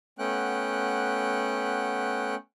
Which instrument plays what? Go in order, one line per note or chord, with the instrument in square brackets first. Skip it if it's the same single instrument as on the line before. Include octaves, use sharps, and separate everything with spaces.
[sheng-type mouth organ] A3 B3 C#4 F#5 G5 F#6